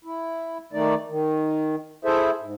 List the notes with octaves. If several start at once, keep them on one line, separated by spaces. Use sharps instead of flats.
E4
D#3 A3 D#4 D5
D#3
E4 G#4 A4 C5 E5
G#2